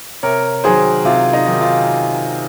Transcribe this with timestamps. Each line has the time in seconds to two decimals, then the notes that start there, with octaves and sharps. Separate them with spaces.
0.23 C3 A#4 C#5
0.64 D#3 F#3 G#4 C5
1.05 C3 F4
1.33 D#4
1.47 D#3 F#3
1.61 F4